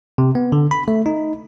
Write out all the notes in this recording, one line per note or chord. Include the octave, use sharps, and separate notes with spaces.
C3
B3
D3
B5
A3
D#4